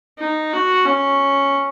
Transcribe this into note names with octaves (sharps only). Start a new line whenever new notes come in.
D#4
F#4
C#4